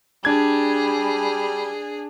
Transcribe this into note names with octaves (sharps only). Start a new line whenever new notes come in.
G3 D4 G#4 G#6